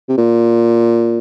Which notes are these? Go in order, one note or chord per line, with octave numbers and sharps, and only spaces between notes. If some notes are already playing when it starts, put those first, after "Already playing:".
C3
A#2